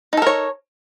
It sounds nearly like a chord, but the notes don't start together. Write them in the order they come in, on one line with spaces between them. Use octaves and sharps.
D#4 A4 A#4 C#5